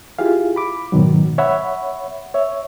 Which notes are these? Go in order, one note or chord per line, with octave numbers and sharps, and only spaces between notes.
E4 F4 G4 G#4 F5
B5 D6
G#2 B2 D#3 F#3
C#5 E5 F#5 B5
C#5 E5